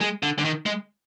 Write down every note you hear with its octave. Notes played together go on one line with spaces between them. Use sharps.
G#3
D3
D3
D#3
G#3